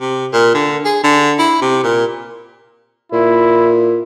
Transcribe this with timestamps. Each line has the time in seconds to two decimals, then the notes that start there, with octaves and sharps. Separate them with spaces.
0.01 C3
0.33 A#2
0.54 D3
0.85 G#4
1.04 D3
1.39 E4
1.62 C3
1.84 A#2
3.12 A#2 E4